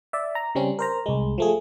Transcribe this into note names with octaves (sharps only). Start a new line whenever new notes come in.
D5 E5
A#5
C#3 G3 C4 C#4
A#4 C5 A#5
C2 G#3
F3 A3 G#4